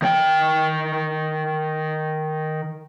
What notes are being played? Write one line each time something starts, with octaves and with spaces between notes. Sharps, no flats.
D#3 G5